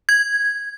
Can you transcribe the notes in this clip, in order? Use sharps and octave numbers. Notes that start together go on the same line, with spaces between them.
G#6